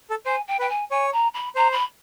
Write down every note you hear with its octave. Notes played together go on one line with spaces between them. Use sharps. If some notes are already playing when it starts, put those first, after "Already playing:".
A4
C5 G#5
G5
B4 G5
G#5
C#5 G#5
A#5
B5
C5 A#5
B5